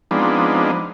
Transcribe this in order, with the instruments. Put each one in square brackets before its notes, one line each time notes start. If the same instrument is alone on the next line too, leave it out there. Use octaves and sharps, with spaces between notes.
[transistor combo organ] F3 G#3 B3 C4 D4 D#4